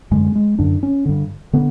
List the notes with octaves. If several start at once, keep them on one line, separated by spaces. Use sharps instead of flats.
F#2 D3 G#3
G#3
F#2 D3 D4
C#4
G2 D3
D3 B3